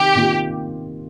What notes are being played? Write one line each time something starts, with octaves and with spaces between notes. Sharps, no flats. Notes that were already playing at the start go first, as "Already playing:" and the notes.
Already playing: C3 D#3 G4
C3 D#3 A#3 F4